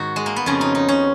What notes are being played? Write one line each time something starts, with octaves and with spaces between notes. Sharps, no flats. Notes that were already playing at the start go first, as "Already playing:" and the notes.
Already playing: G#2 D#3 D#4 F#4
G#3
A#3
B3
F2 C#3 C#4
D#4
D#4
C#4